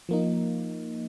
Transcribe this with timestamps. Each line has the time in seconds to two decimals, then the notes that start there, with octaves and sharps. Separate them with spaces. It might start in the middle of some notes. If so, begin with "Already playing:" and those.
0.09 F3 A#3 D#4